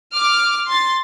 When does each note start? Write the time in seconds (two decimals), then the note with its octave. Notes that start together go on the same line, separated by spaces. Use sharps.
0.13 D6 F6
0.68 C6 A6